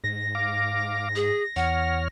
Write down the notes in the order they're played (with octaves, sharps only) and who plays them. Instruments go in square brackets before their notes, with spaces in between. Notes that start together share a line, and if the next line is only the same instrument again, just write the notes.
[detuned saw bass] G#2 [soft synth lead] A#6
[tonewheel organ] F5 D6
[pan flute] G#4
[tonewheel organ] E2 C#5 F6 [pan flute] F#5